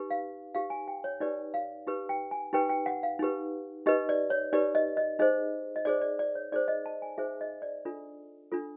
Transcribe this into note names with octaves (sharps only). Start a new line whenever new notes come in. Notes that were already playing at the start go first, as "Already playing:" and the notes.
Already playing: D#4 G4 B4
F5
D#4 G4 B4 F5
G#5
G5
C#5
D#4 G4 B4 D5
F5
D#4 G4 B4
G5
G#5
D#4 G4 B4 G5
G5
F#5
F5
D#4 G4 B4
D#4 G4 B4 D#5
D5
C#5
D#4 G4 B4 D5
D#5
D#5
D#4 G#4 C5 D#5
D#5
D#4 G#4 C5 D5
D5
D5
C#5
D#4 G#4 C5 D5
D#5
A5
G#5
D#4 G#4 C5 E5
D#5
D5
D4 F4 A4
D4 F4 A4